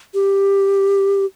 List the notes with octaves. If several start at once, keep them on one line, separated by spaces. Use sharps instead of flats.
G4